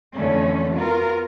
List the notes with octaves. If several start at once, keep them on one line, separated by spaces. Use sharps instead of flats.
F2 D3 E3 A3 C#4
B3 F4 F#4 A#4